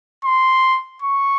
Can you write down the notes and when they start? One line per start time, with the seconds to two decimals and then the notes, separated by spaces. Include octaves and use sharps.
0.25 C6
1.02 C#6